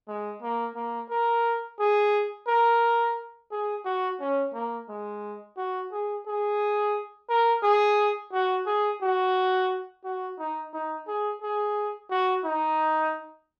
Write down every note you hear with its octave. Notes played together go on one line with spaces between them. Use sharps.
G#3
A#3
A#3
A#4
G#4
A#4
G#4
F#4
C#4
A#3
G#3
F#4
G#4
G#4
A#4
G#4
F#4
G#4
F#4
F#4
D#4
D#4
G#4
G#4
F#4
D#4